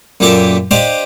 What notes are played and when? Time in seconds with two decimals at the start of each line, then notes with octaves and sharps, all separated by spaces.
0.20 F#2 A#2 A#3 G4 A4 E5
0.71 D4 G4 C5 D#5 F5 G5